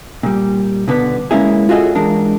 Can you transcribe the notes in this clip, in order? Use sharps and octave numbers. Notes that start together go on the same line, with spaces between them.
A#2 G3
B2 D3 B3 B4
G#3 A#3 C#4 E4 G#4
F4 F#4 G#4 A4 D#5
E3 G#3 D4 A#4